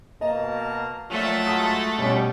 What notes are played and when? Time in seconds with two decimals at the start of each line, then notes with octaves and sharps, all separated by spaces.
0.21 B2 A#3 D#5 A5 A#5
1.11 A#2 F3 F#3 A3 F4 E5
1.47 G#3 F#4 A4 A5 D#6
1.98 B2 G3 B3 C#4 F#4 C#5